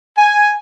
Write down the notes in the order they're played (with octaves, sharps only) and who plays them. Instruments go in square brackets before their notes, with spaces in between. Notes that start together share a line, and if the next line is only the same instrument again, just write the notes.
[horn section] G#5